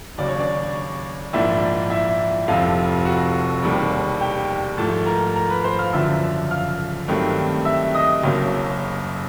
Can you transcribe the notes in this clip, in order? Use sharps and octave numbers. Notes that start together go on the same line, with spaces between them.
D#2 C#3 F#3 D5
C#5
D4 D5
A#1 G#2 F3 A#3 D4 E4 E5
E4 E5
F1 F2 C3 F3 F4 F5
F#4 F#5
E1 D#2 D#3 G3
G4 G5
G#2 F3 A3 A4 A5
A#4 A#5
A#4 A#5
B4 B5
C5 C6
F5 F6
F#1 F#2 D3 F3 E5 E6
F5 F6
G2 D#3 F#3 A3 C4
E5 E6
D#5 D#6
F#1 F#2 C#3 F#3 A#3